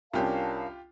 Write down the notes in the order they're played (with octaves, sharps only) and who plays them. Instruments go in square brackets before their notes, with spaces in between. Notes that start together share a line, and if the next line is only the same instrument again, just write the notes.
[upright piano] C2 C#4 D4 [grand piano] F4 G4 [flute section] A#4 F5 A5